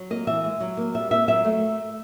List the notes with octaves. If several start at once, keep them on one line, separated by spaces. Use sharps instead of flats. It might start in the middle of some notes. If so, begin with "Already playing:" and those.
Already playing: F#3
A#3 D#5
E3 E5
G#3
F#3
A#3
G3 E5
A#3 E5
F#3 E5
A3